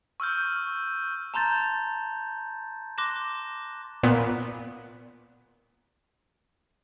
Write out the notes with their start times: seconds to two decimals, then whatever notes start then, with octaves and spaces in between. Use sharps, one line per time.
0.20 C#6 E6 F6 G6
1.34 A5 A#5 C6 G6 A6
2.98 C6 D6 F#6 A#6 E7
4.03 A#2 B3